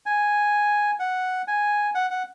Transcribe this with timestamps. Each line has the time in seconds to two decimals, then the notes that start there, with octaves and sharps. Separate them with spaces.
0.06 G#5
0.99 F#5
1.48 G#5
1.95 F#5
2.10 F#5